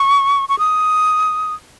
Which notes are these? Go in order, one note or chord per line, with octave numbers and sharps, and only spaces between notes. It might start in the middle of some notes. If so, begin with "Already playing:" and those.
Already playing: C#6
C#6
D#6